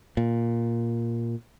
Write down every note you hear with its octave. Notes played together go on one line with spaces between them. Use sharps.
A#2